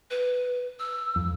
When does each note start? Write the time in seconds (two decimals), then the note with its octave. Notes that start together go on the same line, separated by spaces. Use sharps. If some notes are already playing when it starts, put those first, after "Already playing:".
0.10 B4
0.79 E6
1.16 F2